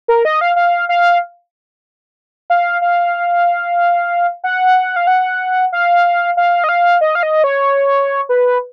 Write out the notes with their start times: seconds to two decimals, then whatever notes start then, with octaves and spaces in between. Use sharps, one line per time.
0.08 A#4
0.25 D#5
0.41 F5
0.56 F5
0.89 F5
2.50 F5
2.82 F5
4.44 F#5
4.96 F5
5.07 F#5
5.72 F5
6.37 F5
6.64 D#5
6.69 F5
7.01 D#5
7.15 F5
7.23 D#5
7.44 C#5
8.29 B4